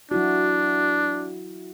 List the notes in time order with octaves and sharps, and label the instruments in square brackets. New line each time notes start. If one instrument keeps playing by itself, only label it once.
[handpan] F#3 E4 F#4 [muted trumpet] D4